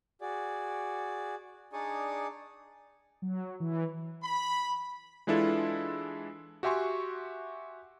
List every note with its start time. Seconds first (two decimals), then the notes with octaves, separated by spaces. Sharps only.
0.21 F#4 G#4 D5
1.73 D4 D#4 G#4 D5 C#6 D#6
3.22 F#3
3.60 E3
4.23 B5
5.27 E3 G#3 D4 E4 F4 A4
6.63 F#4 G4 E5 G#5 C6 C#6